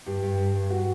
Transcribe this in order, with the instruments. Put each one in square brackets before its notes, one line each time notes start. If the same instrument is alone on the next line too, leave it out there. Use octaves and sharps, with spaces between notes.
[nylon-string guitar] G2 [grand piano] G4
[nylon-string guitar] G2
G2
G2
[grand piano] F#4